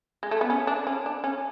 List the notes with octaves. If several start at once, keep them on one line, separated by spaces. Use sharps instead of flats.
G#3
A3
B3
C#4
D4
C#4
D4
C#4